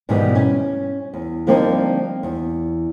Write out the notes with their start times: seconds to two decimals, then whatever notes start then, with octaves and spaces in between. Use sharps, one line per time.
0.09 G#2 B2 D#3 E3 G3 G#3
0.35 C#4
1.14 E2
1.47 D3 F3 G3 A#3 C4 D#4
2.23 E2